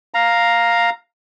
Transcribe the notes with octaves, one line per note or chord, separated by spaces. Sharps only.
F5 A#5